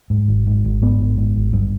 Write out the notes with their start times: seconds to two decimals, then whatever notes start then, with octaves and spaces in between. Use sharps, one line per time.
0.10 G#2
0.28 G#1
0.47 G#2
0.65 G#1
0.82 G#2 B3
1.00 G#1
1.17 G#2
1.36 G#1
1.53 G2